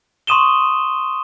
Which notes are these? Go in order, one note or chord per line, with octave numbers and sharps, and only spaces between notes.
C6 C#6 D#6 D#7 E7 G7